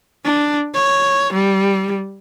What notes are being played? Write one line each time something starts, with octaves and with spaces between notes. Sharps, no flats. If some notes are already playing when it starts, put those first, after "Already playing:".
D4
C#5
G3